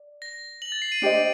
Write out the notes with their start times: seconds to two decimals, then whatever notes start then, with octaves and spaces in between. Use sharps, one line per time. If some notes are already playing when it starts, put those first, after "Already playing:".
Already playing: D5
0.22 A#6
0.62 F#7
0.72 A6
0.82 C7
0.92 D#7
1.02 D4 G4 C5 D#5 D7